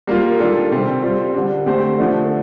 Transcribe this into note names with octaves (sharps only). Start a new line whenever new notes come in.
G3 A#3 F4
D#3 G3 D4 F4 A4
C3 G3 C4 G4
G3 C4 F4
D3 G3 D4
D3 A3 C4 G4 C5
D3 F3 A3 D4